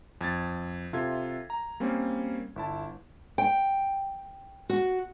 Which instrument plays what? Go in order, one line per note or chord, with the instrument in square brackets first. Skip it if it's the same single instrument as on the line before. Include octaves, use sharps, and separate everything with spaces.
[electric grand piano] F2 G#6 A6
C3 F4 A4 E5 G#6
A#5
G3 A#3 C4 C#4
G1 E4 A5
[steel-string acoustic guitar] G5
F#4